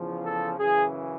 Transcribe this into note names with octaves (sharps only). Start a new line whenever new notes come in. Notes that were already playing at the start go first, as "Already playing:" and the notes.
Already playing: E2 C#3 F3
A4
F#2 C#3 E3 G#4